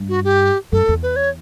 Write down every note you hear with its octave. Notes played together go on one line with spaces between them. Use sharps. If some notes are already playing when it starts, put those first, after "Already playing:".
Already playing: G2
F#4
G4
F#2 A4
E2
B4
C#5